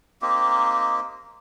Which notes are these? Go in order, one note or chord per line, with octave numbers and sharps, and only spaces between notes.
A#3 C4 D#4 G4